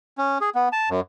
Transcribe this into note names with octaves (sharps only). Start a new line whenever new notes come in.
C#4
G#4
B3
A5
F#2